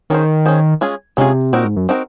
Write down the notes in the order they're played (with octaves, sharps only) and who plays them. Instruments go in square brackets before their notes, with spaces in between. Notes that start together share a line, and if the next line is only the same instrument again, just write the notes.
[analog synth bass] D#3 [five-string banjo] C#4 G#4 C5
[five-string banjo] C#4 G#4 C5
G#3 C#4 F4 G#4
[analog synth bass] C3 [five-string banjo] G#3 C#4 F4 G#4
[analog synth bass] A#2 [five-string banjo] C4 D#4 F#4 A#4
[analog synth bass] G#2
F#2
[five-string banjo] C4 D#4 F#4 A#4